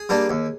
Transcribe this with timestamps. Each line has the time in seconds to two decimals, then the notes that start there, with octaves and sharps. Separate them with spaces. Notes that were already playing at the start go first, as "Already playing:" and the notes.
Already playing: G#4
0.09 G3 A#3 D4
0.30 D#2